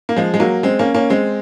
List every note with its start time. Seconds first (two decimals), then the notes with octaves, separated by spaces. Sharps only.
0.09 A#3
0.16 F3 G#3
0.34 G#3
0.40 F#3 A#3
0.63 G#3 C4
0.79 A#3 C#4
0.94 A#3 C#4
1.10 G#3 C4